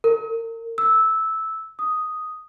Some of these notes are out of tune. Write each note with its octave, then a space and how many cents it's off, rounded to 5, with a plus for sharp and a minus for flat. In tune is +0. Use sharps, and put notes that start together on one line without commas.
A#4 -35
E6 -10
D#6 +0